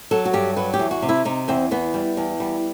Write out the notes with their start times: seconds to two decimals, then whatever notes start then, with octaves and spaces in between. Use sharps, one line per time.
0.11 F#3 A4
0.25 F#4
0.33 G2 G4
0.56 F#3 B4
0.74 G4
0.79 E2
0.91 F#4
1.02 C3
1.09 E4
1.25 C3 D#4
1.48 E2 C4
1.71 E2 B3
1.94 G3
2.17 E2
2.40 G3